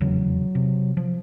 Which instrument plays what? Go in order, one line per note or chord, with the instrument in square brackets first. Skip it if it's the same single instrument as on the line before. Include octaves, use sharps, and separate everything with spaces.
[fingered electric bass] F1 E2 C#3 [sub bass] F#3
[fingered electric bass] C3
F3